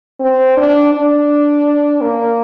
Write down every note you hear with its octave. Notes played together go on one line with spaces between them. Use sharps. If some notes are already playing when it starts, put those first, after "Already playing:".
C4
D4
D4
A#3